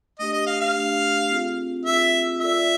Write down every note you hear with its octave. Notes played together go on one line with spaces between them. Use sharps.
A3 D4 G4 D#5
D#5
F5
F5
A3 D4 G4
C4 F4 G#4
C4 F4 G#4 E5
F4 A4 D5 E5